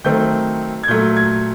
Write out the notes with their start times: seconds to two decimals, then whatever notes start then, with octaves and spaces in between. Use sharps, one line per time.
0.04 D#3 F#3 A3 C4 G6
0.83 G#6
0.88 A#2 F#3 A3 G6
1.16 G#6